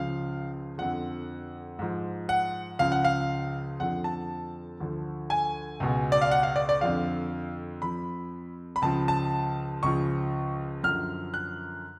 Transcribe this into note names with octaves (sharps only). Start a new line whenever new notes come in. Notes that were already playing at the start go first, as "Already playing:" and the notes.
Already playing: C#2 C#3 F3 F5
F2 D3 F3 F#5
G#2 F3
F#5
C#2 C#3 F3 F5
F#5
F5
F2 D3 F3 F#5
A5
D2 D3 F3
G#5
C#2 B2
D5
F5
F#5
F5
D5
D5
F2 D3 F3 F5
F2 F3 B5
B5
C#2 C#3 F3 A5
A5
C#2 C#3 F3 C#6
F#2 D3 F3 F6
F#6